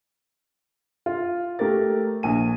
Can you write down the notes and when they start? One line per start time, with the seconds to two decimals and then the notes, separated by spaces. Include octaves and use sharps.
1.06 F4
1.59 A3 G4 A#4 A6
2.23 A#1 G#5 D#7